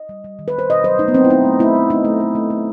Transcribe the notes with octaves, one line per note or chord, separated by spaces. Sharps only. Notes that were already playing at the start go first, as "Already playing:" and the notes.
Already playing: D#5
G3
G3
D#3
B4
G3 C5
B2 D#5
F#3 C5
A3 D#4
B3
F#3 C4
E4
A3 D#4
A3
A3 E4
A3
A3 D#4
A3
A3
A3
A3